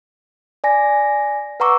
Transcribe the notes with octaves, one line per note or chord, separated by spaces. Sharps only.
D5 G#5 A#6
B4 F#5 A#5 C#6 D6 E6